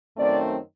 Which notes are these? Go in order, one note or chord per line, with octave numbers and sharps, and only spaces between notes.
F#2 D#3 A3 C4 D5